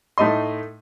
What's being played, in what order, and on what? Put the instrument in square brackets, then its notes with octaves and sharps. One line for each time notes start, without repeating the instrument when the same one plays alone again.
[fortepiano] A2 A3 D#4 D#5 C6